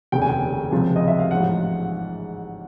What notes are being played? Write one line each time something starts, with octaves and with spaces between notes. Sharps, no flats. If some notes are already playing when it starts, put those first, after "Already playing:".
F1 D#2 C#3 G5
G#5
G5
C#2 C3 F3
D#5
E5
F5
A1 G#2 F3 F#5